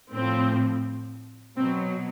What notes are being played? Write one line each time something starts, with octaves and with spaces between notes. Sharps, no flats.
A2 F3 C4
B2 F#3 C4